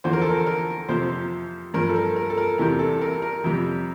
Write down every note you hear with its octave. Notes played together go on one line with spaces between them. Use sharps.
E2 D3 F3 C5
A#4
A4
A#4
A#4
F2 C3 F3 C5
G2 F3 A#4
A4
A#4
A#4
A4
A#4
E2 C3 E3 G3 A#4
A4
A#4
A#4
F2 C3 G3